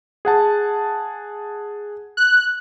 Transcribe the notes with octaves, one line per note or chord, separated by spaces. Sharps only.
G#4 F#5 A5
F#6